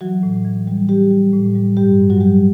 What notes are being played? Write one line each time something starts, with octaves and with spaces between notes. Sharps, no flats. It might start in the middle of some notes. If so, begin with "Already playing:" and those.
E3 F#3 F#4
A2
E3
G3
G3 G4
G3
A2
G3
G2 G3 G4
G2
F#3 F#4
G2 G3 G4